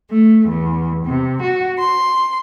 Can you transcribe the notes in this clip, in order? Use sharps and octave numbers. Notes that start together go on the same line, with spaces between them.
A3
E2
C3
F#4
C6